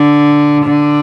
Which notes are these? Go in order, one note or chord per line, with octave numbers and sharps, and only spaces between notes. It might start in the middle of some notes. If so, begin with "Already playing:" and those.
Already playing: D3
D3